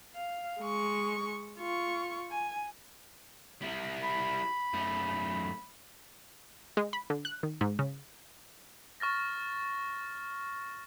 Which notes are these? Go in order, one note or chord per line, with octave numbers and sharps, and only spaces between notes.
F5
G#3 C#6
F4 C#6
G#5
G3 E4
B5
F#2 A3
G#3
B5
D3
F#6
D#3
G#2
C#3
C#6 F6 A6 A#6